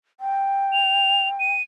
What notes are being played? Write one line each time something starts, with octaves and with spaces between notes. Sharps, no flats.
G5
F7
D#7